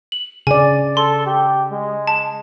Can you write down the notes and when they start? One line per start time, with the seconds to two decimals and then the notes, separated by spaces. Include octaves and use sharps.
0.12 F#7
0.47 C#3 D5 G#5
0.97 A4 C6
1.26 G4
1.71 G#3
2.07 A5